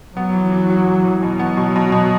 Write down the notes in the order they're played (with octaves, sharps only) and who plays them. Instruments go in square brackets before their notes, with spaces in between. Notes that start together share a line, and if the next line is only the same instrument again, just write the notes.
[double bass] F#3 [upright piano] B3
[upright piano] E3
E3
F#4
E3
E3
[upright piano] B2 [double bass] F#3
[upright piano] B3
B2
B2
B2